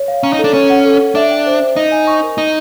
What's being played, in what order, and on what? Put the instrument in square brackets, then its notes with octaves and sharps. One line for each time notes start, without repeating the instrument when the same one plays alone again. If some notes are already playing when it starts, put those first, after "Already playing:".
Already playing: [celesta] C#5
F5
[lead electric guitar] C#4 [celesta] A#5
[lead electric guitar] D#4
[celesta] A4
[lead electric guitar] D4
[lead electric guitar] C#4 [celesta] C#5
[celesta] F#5
A4
A4
[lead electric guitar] D4 [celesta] E5
[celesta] G5
C5
C5
[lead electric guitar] D#4 [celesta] D#5
[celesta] G#5
C#6
A#4
[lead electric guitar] D#4 [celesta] D#5